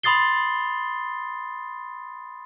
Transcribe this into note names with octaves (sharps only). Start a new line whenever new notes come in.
B5 C6 D#6 A6 C7 G7